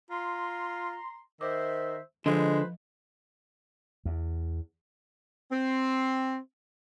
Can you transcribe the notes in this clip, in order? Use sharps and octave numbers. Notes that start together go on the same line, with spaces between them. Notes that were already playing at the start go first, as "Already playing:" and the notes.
F4 A#5 C6
D#3 C5 E5 D6
D3 F3 G#3 F4 B4 C5 D#5 C6
E2
C4